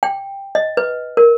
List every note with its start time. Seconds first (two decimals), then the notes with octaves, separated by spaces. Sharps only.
0.03 G5
0.55 D#5
0.77 B4
1.17 A#4